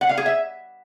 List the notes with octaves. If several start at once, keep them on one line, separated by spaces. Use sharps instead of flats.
F#5
F5
G#4
E5